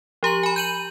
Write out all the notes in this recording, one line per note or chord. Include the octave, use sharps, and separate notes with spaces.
F3 G4 A#5 F#7
G#5 B5
G6 D#7 F#7